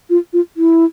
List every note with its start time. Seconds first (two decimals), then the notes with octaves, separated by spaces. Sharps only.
0.10 F4
0.33 F4
0.57 E4